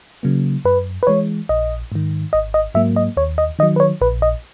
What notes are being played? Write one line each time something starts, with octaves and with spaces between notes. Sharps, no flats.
C#3 F#3 A#3
F#2 B4
B4
E3 G#3 C#5
A#1 D#5
G#2 D#3
G#1 D#5
D#5
G#2 F#3 A#3 E5
D#5
D#2 C#5
D#5
D#3 F#3 D#5
B4
C#5
A#1 B4
D#5